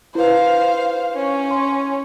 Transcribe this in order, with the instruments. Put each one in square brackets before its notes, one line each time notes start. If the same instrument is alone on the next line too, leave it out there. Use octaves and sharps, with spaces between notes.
[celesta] E4 B4 [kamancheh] C5 F5
[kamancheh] C#4 C#5
[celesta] C6